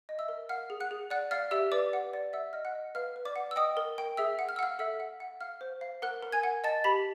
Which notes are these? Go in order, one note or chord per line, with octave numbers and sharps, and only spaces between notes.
D#5
E5 E6
A#4
F5 F#5 F6
G#4
F#5 F#6
G#4
D5 F#5 F#6
D5 F5 F6
G4 E5 E6
B4 D5 D6
F#5
D5
E5 F#5 E6
D#5 F6
F#5 F#6
D#5
B4 F5 F6
B4
D5 D6
F#5
E6
D#5 G5 D#6
A#4
G5
G#4 E5 E6
F#5
F6
E6
F5 F#5 F6
A4 E5 E6
F#5
F#5
F5 F6
C5
F5
A#4 F#5 F#6
A#4
G#5 G#6
F#5
D#5 A5 A6
G4 B5 B6